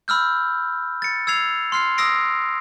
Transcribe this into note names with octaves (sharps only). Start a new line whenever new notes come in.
B5 E6 F6 G6
A6 C#7
E6 G#6 C7 F7
C6 F6 C7
D#6 E6 A#6 C7 D7